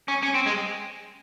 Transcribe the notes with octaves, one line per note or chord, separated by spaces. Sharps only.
C#4
C#4
C4
G#3